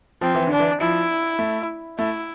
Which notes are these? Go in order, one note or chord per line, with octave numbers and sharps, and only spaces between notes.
F3 C4
E3
D3 D4
E3
F3 E4
A3
A3 E4